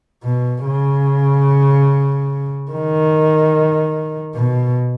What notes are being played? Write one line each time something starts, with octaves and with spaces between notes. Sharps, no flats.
B2
C#3
D#3
B2